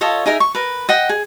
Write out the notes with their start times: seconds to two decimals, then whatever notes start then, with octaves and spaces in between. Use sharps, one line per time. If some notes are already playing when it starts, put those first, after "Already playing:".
0.01 F4 A4 C#5 D#5
0.26 D#4 G#4 A#4 E5
0.40 C#6
0.55 A#4 B4
0.89 D#5 F#5 G5
1.09 G#4